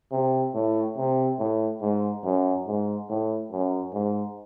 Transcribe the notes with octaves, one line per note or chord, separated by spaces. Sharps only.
C3
A2
C3
A2
G#2
F#2
G#2
A2
F#2
G#2